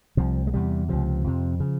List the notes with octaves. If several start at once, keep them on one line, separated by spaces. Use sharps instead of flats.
C2 C3 F3
G#3
E2 C3 G3
C#2 C3 F3
F2 C3
C#3